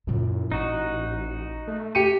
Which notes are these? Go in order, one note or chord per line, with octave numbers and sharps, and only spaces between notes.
F#2 A#2 E4
A1 D#4 F#4
A3
G4 C#7 D#7